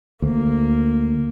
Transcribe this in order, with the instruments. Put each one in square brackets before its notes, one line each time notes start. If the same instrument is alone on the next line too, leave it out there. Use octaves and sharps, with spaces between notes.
[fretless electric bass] D2 [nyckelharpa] A#3